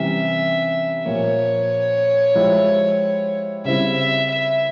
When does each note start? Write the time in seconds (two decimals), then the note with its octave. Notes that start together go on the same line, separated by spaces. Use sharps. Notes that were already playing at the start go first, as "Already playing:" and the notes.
Already playing: C3 E3 G3 C#4 G4 E5
1.06 A#2 F3 A#3 C#5
2.35 F3 G#3 E4 G4
3.65 C#3 G3 C4 E4 E5
3.97 E5
4.30 E5